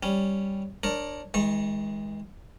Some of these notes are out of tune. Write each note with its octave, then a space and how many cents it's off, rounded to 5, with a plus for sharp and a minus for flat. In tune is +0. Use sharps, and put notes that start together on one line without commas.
G3 +0 C#4 +0
D4 +0 A#4 +0 C#5 -25
E3 -45 G#3 +0 C#6 -30